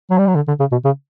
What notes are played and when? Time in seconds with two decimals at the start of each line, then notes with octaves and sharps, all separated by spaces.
0.11 F#3
0.19 G3
0.27 F#3
0.36 D3
0.48 D3
0.60 C#3
0.72 B2
0.85 C#3